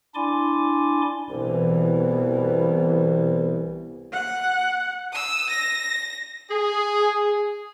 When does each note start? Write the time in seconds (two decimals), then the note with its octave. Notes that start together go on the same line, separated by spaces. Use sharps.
0.15 D4 E4 D5 G#5 C6 D6
1.29 C2 B2 E3 B3
4.13 F#5
5.13 D#6 E6
5.50 A#6
6.50 G#4